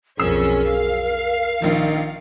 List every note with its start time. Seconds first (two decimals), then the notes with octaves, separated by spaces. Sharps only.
0.20 B1 F2 C#4 G#4 A#4 E6 C7 E7
0.67 F5
1.62 A#1 D#3 F3